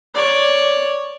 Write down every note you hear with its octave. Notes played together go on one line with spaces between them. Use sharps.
C#5 D5